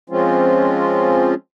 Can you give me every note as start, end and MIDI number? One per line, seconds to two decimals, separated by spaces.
0.10 1.34 53
0.10 1.34 56
0.10 1.34 60
0.10 1.34 61
0.10 1.34 65